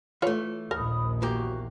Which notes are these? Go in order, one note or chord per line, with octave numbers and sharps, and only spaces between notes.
E3 A3 F4 B4 C#5
A#1 D#2 A#4 B5 D#6
E2 A#3 F#4 G4